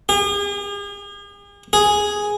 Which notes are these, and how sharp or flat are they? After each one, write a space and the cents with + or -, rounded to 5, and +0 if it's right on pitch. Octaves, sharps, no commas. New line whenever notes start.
G#4 -45
G#4 +0